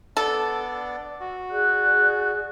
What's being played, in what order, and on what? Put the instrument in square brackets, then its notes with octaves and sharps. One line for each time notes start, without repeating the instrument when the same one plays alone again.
[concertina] B3 D4 D5 [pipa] A4
[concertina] F#4
[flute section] G#4 D5 F#6